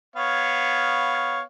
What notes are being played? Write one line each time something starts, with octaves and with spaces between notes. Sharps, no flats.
B3 C#5 F5